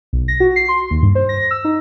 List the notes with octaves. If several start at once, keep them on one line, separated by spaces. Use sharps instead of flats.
B1
A#6
F#4
C7
C6
D#2
G2
C5
A#6
E6
D#4